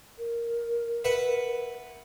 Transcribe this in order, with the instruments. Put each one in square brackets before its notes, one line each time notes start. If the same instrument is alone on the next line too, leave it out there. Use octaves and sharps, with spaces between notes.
[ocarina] A#4
[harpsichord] B4 E5 F#5